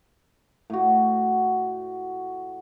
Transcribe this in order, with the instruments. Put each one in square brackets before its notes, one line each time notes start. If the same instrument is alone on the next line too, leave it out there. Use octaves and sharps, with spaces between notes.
[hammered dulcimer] A2 F#4